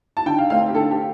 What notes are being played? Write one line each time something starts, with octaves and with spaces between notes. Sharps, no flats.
A5
D3 G5
F5
A3 C4 F5
G4
D3 A4
G4